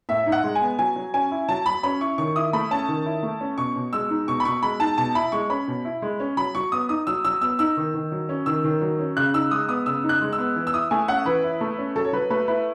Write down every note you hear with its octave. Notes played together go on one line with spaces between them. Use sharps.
A2 E5
D#4
F#5
G#3
G#5
B3
F#3 G#5
F#3
C#4 G#5
E4
F#3 A5
F#3 B5
C#4 B5
E4 C#6
D#3 C#6
E4 D#6
A3 B5
C#4 A5
D#3
E4
A3
C#4
B2 C#6
B2
G#3 E6
D#4
B2 C#6
B5
B2 C#6
G#3 B5
D#4 A5
B2 A5
E4 B5
G#3 C#6
C#4 B5
B2
E4
G#3
C#4
F#3 B5
F#3 C#6
B3 D#6
D#4 D#6
F#3 E6
F#3 E6
B3 E6
D#4 E6
D#3
D#3
F#3
C#4
D#3 E6
D#3
F#3
C#4
C#3 F#6
D#4 E6
G#3 D#6
B3 D#6
C#3 E6
D#4
F#6
G#3
E6
B3
E3
E6
E4 D#6
A3 G#5
C#4 F#5
E3 B4
E4
A3
C#4
F#3 A4
C#5
F#3 B4
A3 B4
E4 B4